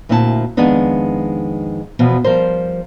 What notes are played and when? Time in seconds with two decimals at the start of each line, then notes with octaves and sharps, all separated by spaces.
0.09 D2 A#2 C4 E4 G4 A5
0.57 F2 D#3 G#3 B3 D4 D#4
1.99 E2 B2 F3
2.24 F3 G3 A#4 C5